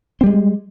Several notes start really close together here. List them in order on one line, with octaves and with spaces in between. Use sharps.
C4 G3 G#3